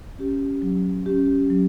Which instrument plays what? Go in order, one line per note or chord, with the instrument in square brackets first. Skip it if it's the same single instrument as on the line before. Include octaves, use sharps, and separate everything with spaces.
[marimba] C#4 G4
F#3
C#4 G4
F#3